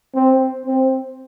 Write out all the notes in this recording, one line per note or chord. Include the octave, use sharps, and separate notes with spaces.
C4
C4